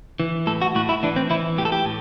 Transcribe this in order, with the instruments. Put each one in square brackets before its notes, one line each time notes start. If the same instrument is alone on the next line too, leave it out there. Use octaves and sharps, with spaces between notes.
[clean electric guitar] E3
A2 A4
F#4
A2 F#4
E4
E3 D4
C4
E3 E4
A2 G4
A4
G4
A2